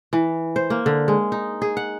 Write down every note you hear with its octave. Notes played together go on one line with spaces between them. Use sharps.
E3
C5
A#3
D3
G#3
D#4
G#4
F#5